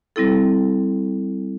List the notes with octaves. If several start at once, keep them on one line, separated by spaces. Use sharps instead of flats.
G3 C4 E4 A4